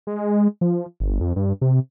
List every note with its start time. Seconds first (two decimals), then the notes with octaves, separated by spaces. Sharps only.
0.07 G#3
0.61 F3
1.00 G1
1.20 F2
1.36 G2
1.62 C3